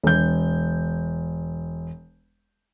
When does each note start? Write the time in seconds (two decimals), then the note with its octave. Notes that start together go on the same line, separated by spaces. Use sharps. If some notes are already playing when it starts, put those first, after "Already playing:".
0.03 E1 G6